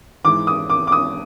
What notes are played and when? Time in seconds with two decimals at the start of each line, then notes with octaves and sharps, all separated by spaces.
0.24 G#2 E3 D6
0.47 D#6
0.70 D6
0.87 D6
0.92 D#6